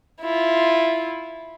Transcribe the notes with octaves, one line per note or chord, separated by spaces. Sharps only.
E4 F4